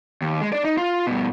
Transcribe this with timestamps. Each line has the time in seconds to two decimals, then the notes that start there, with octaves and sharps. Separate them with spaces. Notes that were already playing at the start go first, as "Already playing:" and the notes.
0.22 D#2
0.41 G#3
0.53 D4 D5
0.65 D#4
0.77 F4
1.07 G2 B2